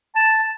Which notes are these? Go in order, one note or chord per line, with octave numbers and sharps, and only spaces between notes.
A5